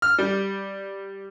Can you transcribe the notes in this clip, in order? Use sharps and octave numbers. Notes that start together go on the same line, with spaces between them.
F6
G3